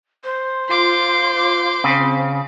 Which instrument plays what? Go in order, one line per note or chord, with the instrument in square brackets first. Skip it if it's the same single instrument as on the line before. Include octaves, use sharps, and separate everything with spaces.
[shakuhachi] C5
[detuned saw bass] F4 [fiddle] C6 D6
[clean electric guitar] C#3 [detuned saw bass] C4